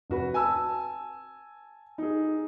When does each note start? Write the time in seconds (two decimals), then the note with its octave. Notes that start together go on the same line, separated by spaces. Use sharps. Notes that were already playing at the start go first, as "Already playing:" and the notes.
0.10 F1 F#4 B4
0.34 G#5 A5 E6
1.98 D#4 G#4